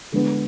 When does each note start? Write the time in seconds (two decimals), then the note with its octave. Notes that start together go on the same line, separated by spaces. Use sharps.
0.12 D3 G#3 B3